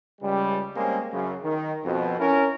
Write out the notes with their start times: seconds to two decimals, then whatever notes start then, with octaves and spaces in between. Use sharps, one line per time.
0.21 C#2 G3
0.75 G3 G#3 A#3 C4 C#4 G#4
1.12 F#2 C#3
1.43 D#3
1.84 F2 B2
2.19 C#4 E4 A#4